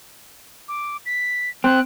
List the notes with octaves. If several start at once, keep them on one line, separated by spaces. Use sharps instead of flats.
D6
B6
C4 F#6